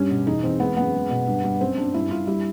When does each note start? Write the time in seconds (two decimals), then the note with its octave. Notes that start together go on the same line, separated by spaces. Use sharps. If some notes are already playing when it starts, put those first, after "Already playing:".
Already playing: G2 G3 C#4
0.10 B2
0.27 E2 D#4
0.43 E2 C4
0.60 G#3 B3
0.77 F#2 B3
0.94 G#3
1.10 B2
1.27 G2
1.44 G2
1.61 F#2 C4
1.77 F#2 D4
1.94 G2 E4
2.10 G2 F4
2.27 G3 E4